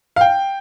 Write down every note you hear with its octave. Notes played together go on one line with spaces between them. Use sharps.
F5
G5